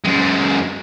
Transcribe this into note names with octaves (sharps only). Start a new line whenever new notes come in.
F#2 G#3